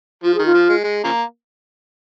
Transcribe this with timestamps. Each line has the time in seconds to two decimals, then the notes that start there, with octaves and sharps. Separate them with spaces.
0.24 F3 F4
0.35 D#3 G#4
0.46 F4
0.54 F3
0.69 G#3
0.84 G#3
1.04 C#3 F3 A#3